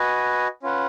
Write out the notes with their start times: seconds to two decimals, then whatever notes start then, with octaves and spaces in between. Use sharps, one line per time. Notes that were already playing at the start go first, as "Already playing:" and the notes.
Already playing: F#4 B4 D#5 G#5
0.63 C#4 F4 B4 F#5